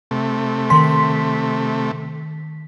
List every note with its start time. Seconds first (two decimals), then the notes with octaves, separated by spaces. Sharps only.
0.11 C3 A3
0.70 D#3 C6 B6